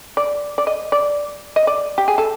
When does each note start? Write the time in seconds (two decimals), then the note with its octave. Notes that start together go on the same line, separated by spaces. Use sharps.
0.17 D5
0.58 D5
0.67 D#5
0.92 D5
1.56 D#5
1.67 D5
1.98 G4
2.08 G#4
2.18 A4